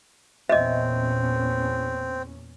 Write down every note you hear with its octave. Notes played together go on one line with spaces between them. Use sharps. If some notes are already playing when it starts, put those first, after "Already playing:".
E2 A#2 C4 C#4 D#5 E5